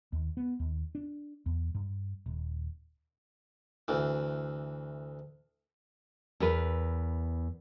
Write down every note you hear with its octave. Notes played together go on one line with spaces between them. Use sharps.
D#2
B3
D#2
D4
E2
G2
D#1
D2 E3
E2 A#4 B4